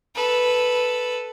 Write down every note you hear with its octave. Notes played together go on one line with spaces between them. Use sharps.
A4 B4